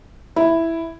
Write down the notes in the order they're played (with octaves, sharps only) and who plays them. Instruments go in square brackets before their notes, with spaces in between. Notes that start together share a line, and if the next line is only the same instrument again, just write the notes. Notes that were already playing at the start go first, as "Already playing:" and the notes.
[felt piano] E4